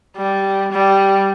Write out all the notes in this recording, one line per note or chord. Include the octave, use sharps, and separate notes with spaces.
G3
G3